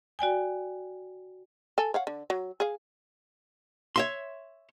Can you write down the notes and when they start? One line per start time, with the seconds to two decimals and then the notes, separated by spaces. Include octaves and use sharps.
0.19 F#4 D5 G5 G#5
1.78 A4 G#5
1.94 C#5 F5 F#5
2.07 D3
2.30 F#3
2.60 G#4 F5
3.96 C#5 E5 C6